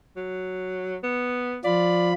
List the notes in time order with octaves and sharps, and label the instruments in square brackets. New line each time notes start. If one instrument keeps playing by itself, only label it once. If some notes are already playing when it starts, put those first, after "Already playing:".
[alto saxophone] F#3
B3
[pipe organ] F3 F4 B5 [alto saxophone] D5